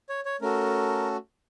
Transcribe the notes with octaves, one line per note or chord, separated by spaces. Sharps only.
C#5
C#5
A3 C#4 F#4 A4 A#4